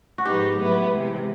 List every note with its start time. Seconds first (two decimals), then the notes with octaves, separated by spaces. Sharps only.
0.18 F#4
0.25 G#2 F3 G#3 B3 D#4 G4
0.58 A2 F#3 B3 E4
0.90 C3 E3 G#3